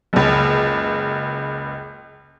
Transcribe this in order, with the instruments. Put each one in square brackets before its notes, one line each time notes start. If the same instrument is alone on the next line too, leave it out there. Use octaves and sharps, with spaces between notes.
[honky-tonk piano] F#1 C#2